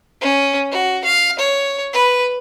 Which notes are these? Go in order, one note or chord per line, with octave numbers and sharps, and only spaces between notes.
C#4
F#4
F5
C#5
B4